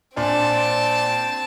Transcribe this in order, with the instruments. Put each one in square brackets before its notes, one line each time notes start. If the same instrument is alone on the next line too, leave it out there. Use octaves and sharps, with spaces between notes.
[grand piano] A#2 D4 G#5 [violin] C4 A5